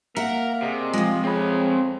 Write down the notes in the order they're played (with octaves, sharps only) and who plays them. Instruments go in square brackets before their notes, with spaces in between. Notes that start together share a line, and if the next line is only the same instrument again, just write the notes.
[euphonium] A#3 [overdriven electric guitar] A#4 [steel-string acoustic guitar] E5 F#5
[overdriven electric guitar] C3 [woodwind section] G#4 D5 D#5
[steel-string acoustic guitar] F3 G#3 [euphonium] F4
[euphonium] F2 [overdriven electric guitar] C4 B5 [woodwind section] G#4 C#5